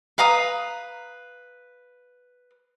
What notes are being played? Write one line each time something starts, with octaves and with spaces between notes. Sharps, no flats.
B4 F5 A#5 D#6